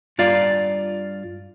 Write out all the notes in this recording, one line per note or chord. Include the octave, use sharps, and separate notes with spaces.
G2 F4 D5 F5